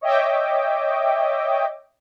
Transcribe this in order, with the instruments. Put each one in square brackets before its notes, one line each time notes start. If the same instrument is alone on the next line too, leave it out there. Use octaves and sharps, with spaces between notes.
[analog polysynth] C#5 D#5 E5 G5 D6